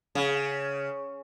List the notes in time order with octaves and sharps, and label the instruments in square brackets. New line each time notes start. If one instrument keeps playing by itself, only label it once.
[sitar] C#3